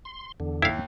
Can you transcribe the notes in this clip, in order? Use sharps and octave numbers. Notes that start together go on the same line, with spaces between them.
C6
E2 D3
D#2 E4 F5